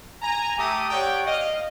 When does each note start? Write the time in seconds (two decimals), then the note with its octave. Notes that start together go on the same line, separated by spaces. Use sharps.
0.22 G#5 A#5
0.58 A3 G4 E5 A#5 D6 D#6
0.90 G4 C#5 D5 F#5 G5
1.26 D#5 F5